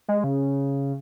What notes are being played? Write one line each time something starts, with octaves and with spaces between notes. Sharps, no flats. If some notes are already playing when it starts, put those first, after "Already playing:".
G#3
C#3